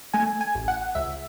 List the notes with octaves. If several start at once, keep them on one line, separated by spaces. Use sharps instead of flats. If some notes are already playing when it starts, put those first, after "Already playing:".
A3 G#5
G#5
A1
F#5
C#2 E5